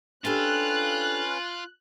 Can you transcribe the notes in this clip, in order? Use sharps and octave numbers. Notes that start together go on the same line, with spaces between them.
C#4 D4 F4 G4 A4 B4 F#6